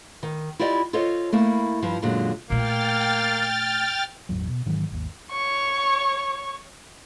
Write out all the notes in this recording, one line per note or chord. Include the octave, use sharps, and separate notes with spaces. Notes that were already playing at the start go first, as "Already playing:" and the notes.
D#3
E4 F4 G4 D5 D#5
F4 A4 C5 C#5 D#5
A3 A#3 E4
G2 F3
F#2 A#2 D3 F#3 G#3
A#2 A3 A#3 G5 F6 A6
G1 E2 A2 F#3
B2
G#2 D#3 E3 F#3
G#1 D#2
C#5 C#6